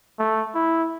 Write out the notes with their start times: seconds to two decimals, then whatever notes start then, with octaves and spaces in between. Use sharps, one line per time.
0.19 A3
0.55 E4